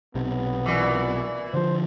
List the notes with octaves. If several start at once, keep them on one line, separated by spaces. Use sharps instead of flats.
B1 C3 B3
A#2 E3
D3 F3 C5